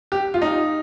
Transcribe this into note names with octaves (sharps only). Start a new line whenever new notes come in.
G4
F4
D#4